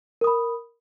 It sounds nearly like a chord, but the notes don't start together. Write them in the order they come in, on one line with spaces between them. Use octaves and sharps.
A#4 D#6 B5